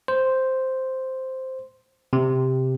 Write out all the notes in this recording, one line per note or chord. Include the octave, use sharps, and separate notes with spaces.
C5
C3